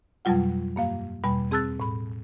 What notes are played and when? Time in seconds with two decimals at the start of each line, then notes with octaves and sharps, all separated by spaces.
0.25 F2 B2 F#3 G3 F4 F#5
0.76 G2 A#3 F5
1.24 E2 B2 G3 B5
1.51 C4 G#4 A5 E6 F#6 A6
1.80 A2 B5